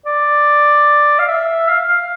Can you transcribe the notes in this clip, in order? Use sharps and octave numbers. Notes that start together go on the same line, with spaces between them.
D5
F5
E5
F5
F5